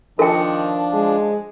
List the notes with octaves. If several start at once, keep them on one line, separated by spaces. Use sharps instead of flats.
D#3 F3 D4 A4 G5
G#3